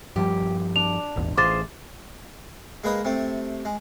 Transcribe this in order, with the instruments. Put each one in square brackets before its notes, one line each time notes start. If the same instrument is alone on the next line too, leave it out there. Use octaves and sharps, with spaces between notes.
[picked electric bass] G2 F3 G3 [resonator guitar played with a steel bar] G4
[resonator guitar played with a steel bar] D4 [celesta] F7
[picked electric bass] D#1 G#1 E2
[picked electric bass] A1 [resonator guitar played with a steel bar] F4 G#4 C5 [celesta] D6 A6
[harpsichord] G#3 A#3 B4 D#5
C3 A3
G#3